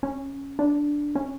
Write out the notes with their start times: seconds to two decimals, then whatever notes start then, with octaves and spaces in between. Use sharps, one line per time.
0.03 C#4
0.59 D4
1.15 C#4